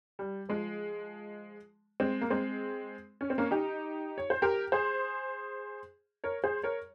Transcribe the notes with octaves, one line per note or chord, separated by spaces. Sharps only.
G3
F3 G#3
G#3 C4
A#3
G#3 C4
C#4
C4
A#3 C#4
D#4 G4
C#5
C5
G4 A#4
G#4 C5
A#4 C#5
G#4 C5
A#4 C#5